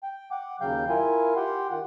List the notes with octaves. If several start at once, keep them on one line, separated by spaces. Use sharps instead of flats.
G5
F#5 D6
D#2 C#3 F#3 F5 G5 G6
E4 F4 A#4 F5 G#5
G4 F#5 G5 C6
D#3 F4 F#5